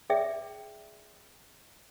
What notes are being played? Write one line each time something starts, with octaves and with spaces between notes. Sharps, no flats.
G#4 D5 E5 G5